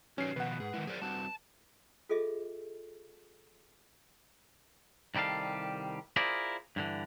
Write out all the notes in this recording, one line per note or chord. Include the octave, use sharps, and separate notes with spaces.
D#3 F#3 C#4 G4 B4 C7
B2 D#3 F3 B4 F#5
G#2 G#4
D#3 G#3 E4 A#4
F#3 G#4 A#4 C5 D5
G3 C4 F#4 A5
F4 G#4 A4 D#5 E5
C2 D#3 G3 A4 F5
E4 F4 G#4 A#4 C5 D5
G2 D3 E3